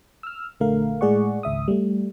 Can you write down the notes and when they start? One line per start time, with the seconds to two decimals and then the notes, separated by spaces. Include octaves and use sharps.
0.23 E6 F6
0.60 A#1 D3 A3 A#4 F5
1.01 A2 G#3 G#4 D5 F#5 C#6
1.43 G#1 C#2 E5 D#6
1.68 G3 A3